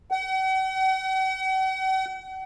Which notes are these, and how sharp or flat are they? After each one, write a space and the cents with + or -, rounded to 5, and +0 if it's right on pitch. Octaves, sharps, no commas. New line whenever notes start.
F#5 +45